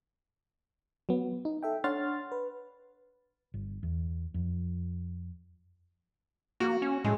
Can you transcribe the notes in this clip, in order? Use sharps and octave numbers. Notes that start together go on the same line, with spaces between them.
F#3 B3
D#4
A4 E5 G5
D4 C#5 F#5 C6 F6 A6
B4
G1
E2
F2
A#3 F#4
C#4
A2 G#3